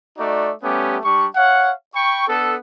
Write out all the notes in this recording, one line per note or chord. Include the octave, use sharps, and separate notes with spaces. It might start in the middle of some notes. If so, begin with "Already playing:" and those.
A3 D#4 F#4 D5
G3 A3 B3 C#4 G4
G3 D4 C#6
C#5 F5 F#5
G5 B5 C#6
B3 D4 A4